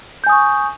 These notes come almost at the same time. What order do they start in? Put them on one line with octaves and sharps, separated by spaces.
G6 G#5 D#6 C#6